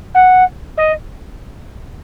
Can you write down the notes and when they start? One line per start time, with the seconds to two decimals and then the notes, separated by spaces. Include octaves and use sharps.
0.15 F#5
0.78 D#5